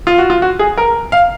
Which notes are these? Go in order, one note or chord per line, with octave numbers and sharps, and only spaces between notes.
F4
F#4
F4
F#4
G#4
A#4
F5